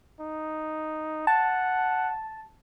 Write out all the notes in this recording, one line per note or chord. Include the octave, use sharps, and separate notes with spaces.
D#4
F#5 A5